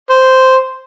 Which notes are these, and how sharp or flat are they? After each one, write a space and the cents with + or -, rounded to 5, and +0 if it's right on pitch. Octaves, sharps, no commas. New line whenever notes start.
C5 -5